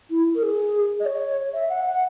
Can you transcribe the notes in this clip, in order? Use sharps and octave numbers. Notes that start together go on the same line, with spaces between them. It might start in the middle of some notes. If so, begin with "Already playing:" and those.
E4
A#4
G#4
D#5
C#5
E5
F#5
F#5